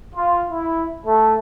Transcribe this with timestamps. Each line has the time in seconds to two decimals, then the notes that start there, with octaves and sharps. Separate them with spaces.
0.15 F4
0.51 E4
1.06 A3